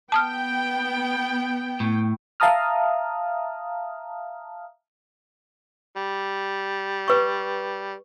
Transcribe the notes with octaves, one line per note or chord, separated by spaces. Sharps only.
B3 G5 A5 D#6 F6
A2
E5 F5 A5 A#5 D#6 F6
G3
B4 C#6